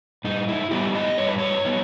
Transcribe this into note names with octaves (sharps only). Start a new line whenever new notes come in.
G2 D#4
E4
G3 B3 D#4 G4
D#5
G2 C#5
B4
C#5
G3 B3 D#4